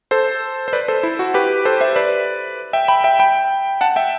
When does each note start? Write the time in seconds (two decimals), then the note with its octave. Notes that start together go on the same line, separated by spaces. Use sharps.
0.11 A4 C5
0.68 C5
0.73 B4 D5
0.88 A4 C5
1.03 E4
1.19 F#4
1.34 G4 B4
1.65 A4 C5
1.81 C5 E5
1.96 B4 D5
2.73 E5 G5
2.88 G5 B5
3.04 E5 G5
3.19 G5 B5
3.81 F#5 A5
3.96 E5 G5